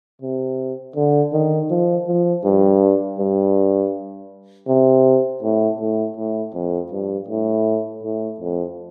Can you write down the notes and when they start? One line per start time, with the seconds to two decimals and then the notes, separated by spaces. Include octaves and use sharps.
0.22 C3
0.96 D3
1.33 D#3
1.70 F3
2.07 F3
2.44 G2
3.19 G2
4.68 C3
5.43 A2
5.79 A2
6.17 A2
6.54 F2
6.91 G2
7.29 A2
8.03 A2
8.40 F2